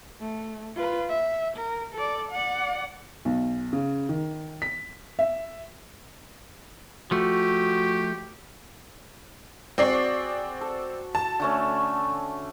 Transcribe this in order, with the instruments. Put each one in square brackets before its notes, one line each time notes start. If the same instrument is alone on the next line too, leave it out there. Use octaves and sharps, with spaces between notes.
[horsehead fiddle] A3
F4 B4
E5
A#4
A4 D5
D5 F#5
[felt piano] B1
C#3
D#3
B6
E5
[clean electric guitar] F3 A3 [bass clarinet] F#4 [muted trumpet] G4
[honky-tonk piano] C4 D5 C7 [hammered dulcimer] F#4 G#4
[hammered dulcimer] A4
[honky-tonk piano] A5
[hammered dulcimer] D3 A3 C#4